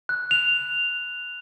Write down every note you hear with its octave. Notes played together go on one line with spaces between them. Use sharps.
F#6
F7